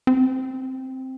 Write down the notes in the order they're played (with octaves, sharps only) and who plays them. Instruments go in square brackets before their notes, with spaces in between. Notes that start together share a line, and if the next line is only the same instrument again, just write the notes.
[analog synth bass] C4